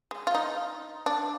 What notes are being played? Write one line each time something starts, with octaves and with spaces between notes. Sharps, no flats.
G#3
F4
D#4
D4